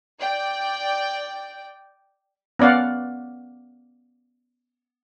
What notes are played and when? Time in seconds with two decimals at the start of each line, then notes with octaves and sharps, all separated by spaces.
0.20 D5 G5
2.59 B3 C#4 D5 F5 F#5